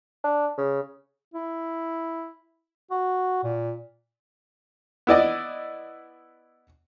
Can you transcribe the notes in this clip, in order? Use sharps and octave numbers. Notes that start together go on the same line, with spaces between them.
D4
C#3
E4
F#4
A#2
B3 E4 D5 D#5